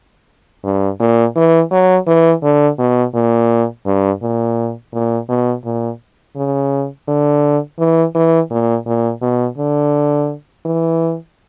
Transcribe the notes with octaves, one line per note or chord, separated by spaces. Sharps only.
G2
A#2
E3
F#3
E3
D3
B2
A#2
G2
A#2
A#2
B2
A#2
C#3
D3
E3
E3
A#2
A#2
B2
D3
E3